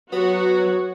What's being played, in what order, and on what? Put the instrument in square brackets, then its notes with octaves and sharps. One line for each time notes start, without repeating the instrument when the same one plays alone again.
[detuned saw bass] F#3 [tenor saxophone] B3 [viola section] F#4 [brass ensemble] C#5